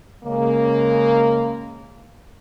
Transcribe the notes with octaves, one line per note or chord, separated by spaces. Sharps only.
C#3 G#3 A#3